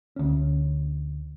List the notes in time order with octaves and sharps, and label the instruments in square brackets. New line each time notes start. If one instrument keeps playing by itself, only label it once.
[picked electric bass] D2 C#4